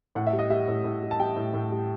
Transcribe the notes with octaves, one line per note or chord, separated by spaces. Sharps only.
A2 F#5
E5
G3
D#5
G3 E5
A2
A2
G3
A5
G3 G5
A2
A2
G3